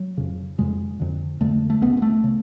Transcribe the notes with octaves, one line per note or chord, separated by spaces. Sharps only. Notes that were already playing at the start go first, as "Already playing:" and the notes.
Already playing: F#3
F2 C#3
F2 C#3 G#3
F2 D3
F2 D3 A3
A3
C#2 C#3 B3
B3
A3
C#3